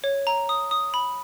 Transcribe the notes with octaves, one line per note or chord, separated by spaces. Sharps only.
C#5
A#5
D#6
D#6
B5